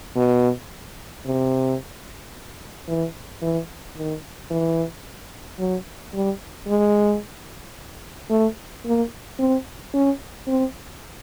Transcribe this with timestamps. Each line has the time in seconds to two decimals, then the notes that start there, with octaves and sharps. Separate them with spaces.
0.17 B2
1.26 C3
2.88 E3
3.42 E3
3.97 D#3
4.51 E3
5.59 F#3
6.14 G3
6.67 G#3
8.30 A3
8.86 A#3
9.39 C4
9.94 C#4
10.48 C4